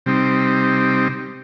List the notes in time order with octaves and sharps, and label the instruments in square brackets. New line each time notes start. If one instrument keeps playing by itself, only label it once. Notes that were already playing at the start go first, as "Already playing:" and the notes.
[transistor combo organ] C3 G3 C4 D#4